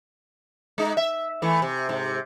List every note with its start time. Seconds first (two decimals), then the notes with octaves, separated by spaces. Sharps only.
0.78 G#3 D#4
0.97 E5
1.42 E3 A3
1.62 C3
1.89 G#2 C3